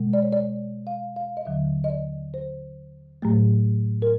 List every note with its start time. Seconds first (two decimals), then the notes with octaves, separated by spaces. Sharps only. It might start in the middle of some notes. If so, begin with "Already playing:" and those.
Already playing: B2 G#3
0.13 D5
0.22 C#5
0.32 D5
0.87 F5
1.16 F5
1.37 D#5
1.45 D#2 D3 F#3 E5
1.84 D#5
1.90 D5
2.34 C5
3.22 A2 F#3 A3
4.02 A#4